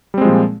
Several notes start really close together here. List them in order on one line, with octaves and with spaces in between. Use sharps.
G3 C4 G#3 F3 A#2